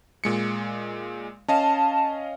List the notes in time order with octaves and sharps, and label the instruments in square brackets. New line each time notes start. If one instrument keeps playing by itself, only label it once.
[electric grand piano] A#2 G#3 C#7
[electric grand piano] C#4 D#5 F5 [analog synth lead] A5